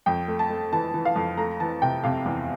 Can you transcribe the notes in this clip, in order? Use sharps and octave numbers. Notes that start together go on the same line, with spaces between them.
F2 G5
A3
A5
A3
E3 A5
E3
F5
F2
A3 A#5
E3 A5
C3 G5
C3 F5
E2